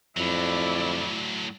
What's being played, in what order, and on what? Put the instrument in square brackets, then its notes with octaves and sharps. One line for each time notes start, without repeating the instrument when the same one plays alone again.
[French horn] F2 [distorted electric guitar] A2 F#3 [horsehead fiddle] E4 D5